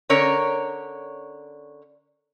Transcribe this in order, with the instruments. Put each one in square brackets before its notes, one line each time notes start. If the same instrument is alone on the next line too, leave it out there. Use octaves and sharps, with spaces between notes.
[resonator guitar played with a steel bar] D3 C#4 A#4 C#5 D5